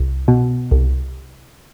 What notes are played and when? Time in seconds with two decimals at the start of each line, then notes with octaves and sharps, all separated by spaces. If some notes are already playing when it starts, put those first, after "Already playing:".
Already playing: C2
0.28 B2
0.71 C2